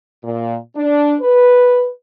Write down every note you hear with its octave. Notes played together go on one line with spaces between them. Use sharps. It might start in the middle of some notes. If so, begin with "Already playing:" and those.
A#2
D4
B4